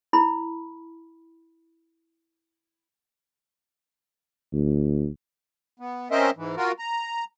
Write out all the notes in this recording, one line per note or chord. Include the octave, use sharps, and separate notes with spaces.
E4 B5
D2
B3
C4 C#4 A#4 C5 D#5 E5
G#2 E3
F4 F#4 A#4
A#5